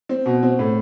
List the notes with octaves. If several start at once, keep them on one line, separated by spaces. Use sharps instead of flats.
C4
B2
C4
A2